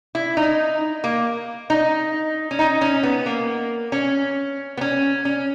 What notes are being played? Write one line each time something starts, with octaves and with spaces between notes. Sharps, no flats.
E4
D#4
A#3
D#4
C#4
D#4
C#4
B3
A#3
C#4
B3
C#4
C#4